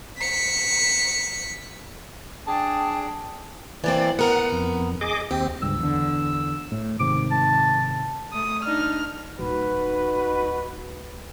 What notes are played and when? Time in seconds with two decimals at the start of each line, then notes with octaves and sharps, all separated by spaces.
0.18 B6 C#7
2.47 D4 G#4 D5 G5 A5
3.84 E3 A#3 C4 D5
4.19 B3 A#4 F#5
4.52 F2
5.01 G#4 D#5 D6
5.31 D#2 C4 G4
5.62 G1 C#2 G2 E6
5.79 E2 D3
6.72 A2
6.99 G#2 C3 D#3 D6
7.31 A5
8.33 A3 D#6
8.65 D4 D#4 F6
9.39 D1 D#4 F#4 B4